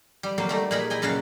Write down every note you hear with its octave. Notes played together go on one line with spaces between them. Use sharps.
G3
F#3 A#3 C4 F5
G3 A3 D#4
A#2 D#4 G#4 A#4 B5
E4 D#5 G5 G#5
F#2 A#2 C#3 A#4 F5 F#5